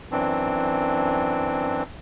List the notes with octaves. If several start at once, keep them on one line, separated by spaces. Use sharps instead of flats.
F#2 E3 C4 D4